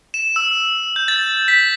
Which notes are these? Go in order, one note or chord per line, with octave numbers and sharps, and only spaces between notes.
E7
E6
G6
A6
B6